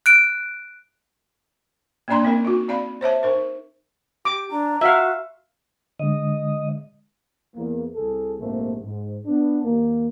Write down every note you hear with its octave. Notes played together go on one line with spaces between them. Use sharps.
F#6 D7
A#3 C#4 D4 D5 A#5 C6
A#3 C4 C#4 A#4
D#4 F#4
C4 D5 F5 B5
C5 C#5 E5 A5
D#4 A#4 C5
G4 D6
D4 A#5
F#4 E5 F5
D3 G#3 D#5
E2 A#3
C2 G#4 A4
A#1 G#2 C3 A3 A#3
G#2
B3 D4
D#2 A#3